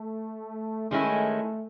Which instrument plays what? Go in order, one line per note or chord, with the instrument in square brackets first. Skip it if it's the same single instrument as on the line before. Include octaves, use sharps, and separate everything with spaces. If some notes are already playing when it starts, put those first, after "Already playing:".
Already playing: [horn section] A3
[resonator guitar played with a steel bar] D#3 G#3 C#4 E4 [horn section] A3